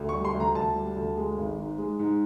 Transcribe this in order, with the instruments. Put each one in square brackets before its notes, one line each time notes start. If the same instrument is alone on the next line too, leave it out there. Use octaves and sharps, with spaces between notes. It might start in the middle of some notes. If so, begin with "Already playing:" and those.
Already playing: [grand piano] D2
C#6
G3
C6
D2
A#5
D2 A5
G3
D2
G#3
G#1
G#2
G#3
G#2